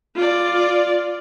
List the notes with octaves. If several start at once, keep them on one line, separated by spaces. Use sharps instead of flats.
F4 D5